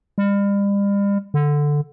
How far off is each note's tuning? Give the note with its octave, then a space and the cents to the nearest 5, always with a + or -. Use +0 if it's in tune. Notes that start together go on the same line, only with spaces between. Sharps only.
G3 +40
D3 +0